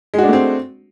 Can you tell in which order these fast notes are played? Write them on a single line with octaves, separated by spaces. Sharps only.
G#3 F#4 D4 A3 C4